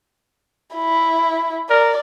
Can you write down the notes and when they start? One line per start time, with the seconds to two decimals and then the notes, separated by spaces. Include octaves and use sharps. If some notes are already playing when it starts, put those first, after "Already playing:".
0.75 E4
1.70 A#4 D5